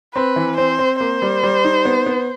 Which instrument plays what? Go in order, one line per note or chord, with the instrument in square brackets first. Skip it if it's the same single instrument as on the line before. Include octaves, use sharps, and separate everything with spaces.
[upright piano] C4 [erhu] B4
[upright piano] E3
[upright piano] C4 [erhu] C5
[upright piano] C4
[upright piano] A#3 [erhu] C5
[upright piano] G3
G3
D#4
B3
B3